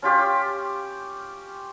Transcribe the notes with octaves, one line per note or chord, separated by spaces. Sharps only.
C#4 F4 G4